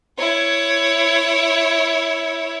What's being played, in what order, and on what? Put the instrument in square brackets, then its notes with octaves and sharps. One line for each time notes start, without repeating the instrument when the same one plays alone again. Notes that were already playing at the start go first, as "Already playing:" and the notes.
[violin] E4 C#5